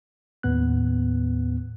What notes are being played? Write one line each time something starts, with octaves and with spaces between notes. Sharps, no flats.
D#2 A2 B3 F#6